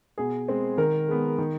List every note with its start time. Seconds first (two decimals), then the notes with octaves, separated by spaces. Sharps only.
0.18 B2 G#4
0.48 G#3 C4
0.78 D#3 A#4
1.08 G#3 B3
1.38 D#3